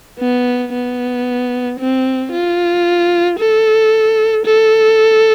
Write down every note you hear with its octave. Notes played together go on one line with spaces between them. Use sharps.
B3
B3
C4
F4
A4
A4